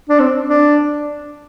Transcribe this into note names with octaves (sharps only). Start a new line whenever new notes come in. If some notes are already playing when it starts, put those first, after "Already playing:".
D4
C4
D4